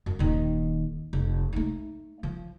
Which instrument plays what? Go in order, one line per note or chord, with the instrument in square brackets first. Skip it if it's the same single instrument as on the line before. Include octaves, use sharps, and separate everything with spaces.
[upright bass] F#2
D#1 D#3
F1
A3 D#4
F3